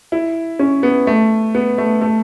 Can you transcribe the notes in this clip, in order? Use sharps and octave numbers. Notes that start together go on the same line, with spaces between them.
E4
C#4
B3
A3
B3
A3
A3